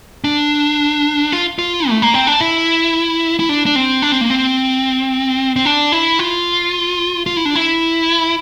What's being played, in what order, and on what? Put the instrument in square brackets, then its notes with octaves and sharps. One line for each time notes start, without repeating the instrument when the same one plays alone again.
[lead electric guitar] D4
F4
F4
A3
A#3
C4
D4
E4
E4
D4
D4
C4
D4
C4
A#3
C4
C4
D4
E4
F4
F4
E4
D4
E4